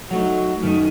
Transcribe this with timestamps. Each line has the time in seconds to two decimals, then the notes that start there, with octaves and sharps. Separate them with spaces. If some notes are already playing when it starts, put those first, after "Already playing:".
0.11 F#3 A3 D#4 F#4
0.63 F#2 D#3 A3 D#4